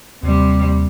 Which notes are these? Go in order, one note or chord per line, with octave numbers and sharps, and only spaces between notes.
D#2 C3 G3